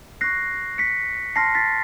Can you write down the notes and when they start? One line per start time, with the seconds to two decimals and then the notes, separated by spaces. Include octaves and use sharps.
0.21 C#6 F#6 A#6 C7
0.78 B6 C#7
1.36 A5 C6 F6 A#6 C7
1.55 A6 B6